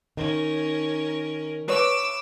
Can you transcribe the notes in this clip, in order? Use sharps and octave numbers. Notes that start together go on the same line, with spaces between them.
D#3 C#4 A#4
B4 C#5 D6 E6